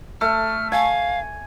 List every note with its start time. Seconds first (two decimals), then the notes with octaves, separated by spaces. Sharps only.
0.21 A3 F6
0.72 F5 G#5